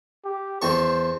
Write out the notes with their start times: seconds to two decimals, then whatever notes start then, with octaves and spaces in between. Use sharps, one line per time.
0.25 G4
0.62 E2 C5 A5 C#6